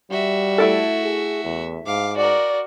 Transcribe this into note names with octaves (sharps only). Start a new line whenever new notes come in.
G3 F#4 E5
A3 E4 A4
G#4
E2
G#2 F5 D6
F#4 A#4 D5